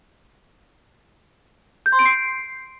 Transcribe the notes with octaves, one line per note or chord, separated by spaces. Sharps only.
G6
C6
D7
C7